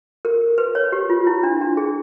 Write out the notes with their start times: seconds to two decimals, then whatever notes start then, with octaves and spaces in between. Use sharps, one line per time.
0.25 A#4
0.58 B4
0.75 C#5
0.92 G4
1.10 F4
1.27 E4
1.43 D4
1.61 D4
1.77 G#4